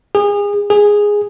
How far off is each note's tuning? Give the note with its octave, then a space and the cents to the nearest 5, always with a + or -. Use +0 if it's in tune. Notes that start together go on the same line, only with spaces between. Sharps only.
G#4 -30
G#4 -5